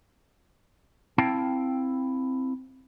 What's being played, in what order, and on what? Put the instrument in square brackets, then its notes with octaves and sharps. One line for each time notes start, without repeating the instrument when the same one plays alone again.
[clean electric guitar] C4 E4 F5 G5 A5